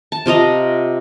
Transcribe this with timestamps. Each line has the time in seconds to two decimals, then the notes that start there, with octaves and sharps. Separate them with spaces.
0.12 A5
0.26 C3 F4 D#5 A#5